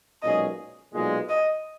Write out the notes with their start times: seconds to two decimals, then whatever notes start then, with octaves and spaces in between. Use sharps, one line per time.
0.22 B1 A#2 G#3 C#4 G#4 D#5
0.94 B1 A#2 G#3
1.29 D#5